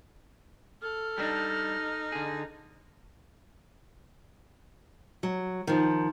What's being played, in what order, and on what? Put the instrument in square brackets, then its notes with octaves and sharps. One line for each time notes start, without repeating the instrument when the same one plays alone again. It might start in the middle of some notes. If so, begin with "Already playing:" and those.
[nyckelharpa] A4 [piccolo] F6
[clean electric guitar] G3 D4 [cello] D#4
[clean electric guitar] D3 G#4
[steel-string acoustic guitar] F#3
D#3 F3